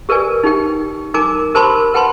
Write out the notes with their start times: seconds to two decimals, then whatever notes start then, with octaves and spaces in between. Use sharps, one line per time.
0.09 G4 A#4 B4 D5 G#5
0.44 D#4 G4 G5
1.14 D#4 A#4 G#5 A#5 D6
1.54 G4 A#4 C5 A5 B5 C6
1.94 B4 F#5 G5 A5 B5 C6